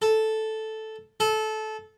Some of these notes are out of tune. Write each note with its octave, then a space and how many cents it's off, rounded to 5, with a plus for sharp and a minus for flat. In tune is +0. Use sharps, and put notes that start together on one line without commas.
A4 -5
A4 -20